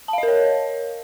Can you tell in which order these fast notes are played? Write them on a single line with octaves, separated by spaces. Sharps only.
A5 F5 D#5 A#4 C#5